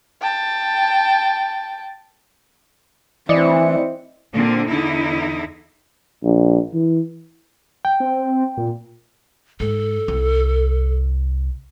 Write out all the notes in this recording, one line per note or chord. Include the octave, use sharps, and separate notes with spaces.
G5 A5
E3 C4 E4 D5 D#5 C#7
A#2 D3 A#3 C4
E2 D3 D#4 E4
A#1
E3
G5
C4
A#2
G#2 A4
C2